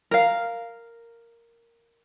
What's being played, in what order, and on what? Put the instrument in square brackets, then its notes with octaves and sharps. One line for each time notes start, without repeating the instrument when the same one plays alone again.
[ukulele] A#4 F5